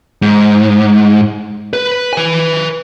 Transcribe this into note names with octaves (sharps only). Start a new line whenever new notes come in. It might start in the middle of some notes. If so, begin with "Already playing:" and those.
G#2
B4
B4 G#5